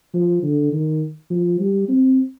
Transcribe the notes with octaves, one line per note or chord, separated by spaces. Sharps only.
F3
D3
D#3
F3
G3
C4